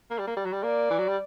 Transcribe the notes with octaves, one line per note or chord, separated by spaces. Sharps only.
A#3
G3
A#3
G3
F#3
G3
A#3 D5
E3
F#3
G3